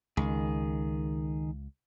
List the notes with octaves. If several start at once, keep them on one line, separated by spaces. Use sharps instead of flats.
C#2 D#3 G#4